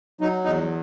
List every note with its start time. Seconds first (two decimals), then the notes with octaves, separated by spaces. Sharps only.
0.21 F#3 D#4
0.44 E2 D#4